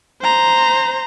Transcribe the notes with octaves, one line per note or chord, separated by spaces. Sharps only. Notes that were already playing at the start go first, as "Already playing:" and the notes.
C5 A#5